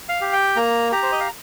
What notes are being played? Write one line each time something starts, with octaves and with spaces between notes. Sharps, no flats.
F5
G4
G5
A#3 A#5
G4 A#5
C5
D#5
F5